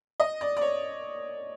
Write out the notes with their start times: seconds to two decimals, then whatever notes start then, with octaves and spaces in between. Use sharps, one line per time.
0.20 D#5
0.41 D5
0.57 D5
0.61 C#5